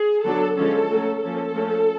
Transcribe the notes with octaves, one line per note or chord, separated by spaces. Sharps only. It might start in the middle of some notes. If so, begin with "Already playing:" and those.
Already playing: G#4
D3 F#3 B3 D4 A4
D3 F3 G#3 C#4 A4
F#3 A3 C#4
F3 A#3 C#4 A4
F3 A3 C#4